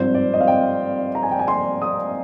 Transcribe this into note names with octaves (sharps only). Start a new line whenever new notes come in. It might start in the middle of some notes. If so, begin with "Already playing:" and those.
Already playing: G#1 G2 F3 C4 C5
D5
D#5
F5
G5
A#5
G#5
G5
G#5
C6
D#6